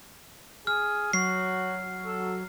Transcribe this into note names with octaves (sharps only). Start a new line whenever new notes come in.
G#4 F6
F#3 F#4 C7
A4